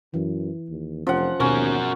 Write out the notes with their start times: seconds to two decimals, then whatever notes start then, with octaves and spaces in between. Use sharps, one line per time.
0.14 F#2 E3
0.69 D#2
1.07 F1 F3 C#4 F#5
1.40 D#2 B2 C#4 F#4 G#4 A#4